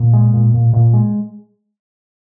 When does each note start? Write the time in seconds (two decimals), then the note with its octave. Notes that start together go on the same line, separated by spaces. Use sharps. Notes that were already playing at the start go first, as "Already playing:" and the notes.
Already playing: A#2
0.13 G#3
0.34 A#2
0.54 A#2
0.73 A#2
0.93 G#3